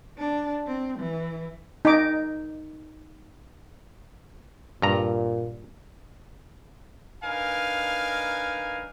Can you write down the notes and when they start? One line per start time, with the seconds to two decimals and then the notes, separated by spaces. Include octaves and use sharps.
0.18 D4
0.67 C4
0.99 E3
1.85 D#4 D6
4.82 G2 A#2 A#5
7.24 D4 D#4 A#4 B4 F5 G#5